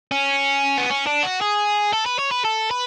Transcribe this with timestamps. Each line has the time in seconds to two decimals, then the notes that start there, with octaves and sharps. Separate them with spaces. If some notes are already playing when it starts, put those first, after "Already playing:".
0.12 C#4
0.78 B3
0.90 C#4
1.07 D4
1.23 F#4
1.41 G#4
1.93 A4
2.06 B4
2.19 C#5
2.32 B4
2.45 A4
2.71 B4